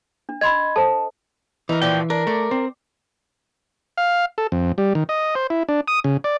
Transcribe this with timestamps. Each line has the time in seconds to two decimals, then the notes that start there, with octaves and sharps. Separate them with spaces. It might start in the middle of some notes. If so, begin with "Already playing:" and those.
0.29 D4
0.41 D#5 B5 C6 G#6
0.76 A4 C5 A5
1.69 E3 D#4 A#4
1.82 A#2 F3 F#4 G5
2.10 D4 A#4
2.27 A3 D5
2.51 C4
3.98 F5
4.38 A4
4.52 F2
4.78 G3
4.95 D#3
5.09 D#5
5.35 C5
5.50 E4
5.69 D4
5.88 D#6
6.04 C#3
6.24 D5